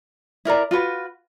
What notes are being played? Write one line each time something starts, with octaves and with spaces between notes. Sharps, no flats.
E4 A#4 D5 A#5
F4 F#4 B4